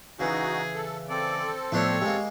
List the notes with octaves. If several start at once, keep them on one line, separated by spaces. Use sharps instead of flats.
C#3 E3 D#4 F#4 G#4
A4
C4 A4 D5
A2 F3 A3 B3 D4 C5 C#5
G#3 A#3 G4